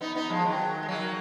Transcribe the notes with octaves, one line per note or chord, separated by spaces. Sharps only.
B3 D#4
B3 D#4
F3 G#3
D#3 F#3
G#3
F#3 A#3